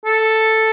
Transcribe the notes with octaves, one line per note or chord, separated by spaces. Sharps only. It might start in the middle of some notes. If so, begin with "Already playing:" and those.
A4